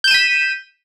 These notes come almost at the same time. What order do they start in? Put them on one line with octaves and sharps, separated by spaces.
G6 E7 D#7 B6